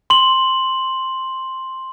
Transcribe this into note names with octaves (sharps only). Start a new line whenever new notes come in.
C6 F#7